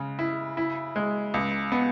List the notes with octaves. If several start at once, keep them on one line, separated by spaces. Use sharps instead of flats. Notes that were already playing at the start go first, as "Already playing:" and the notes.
Already playing: C#3 G#3
E4
E4
G#3
C#2
B3